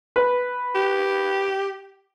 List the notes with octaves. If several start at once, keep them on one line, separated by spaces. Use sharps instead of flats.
B4
G4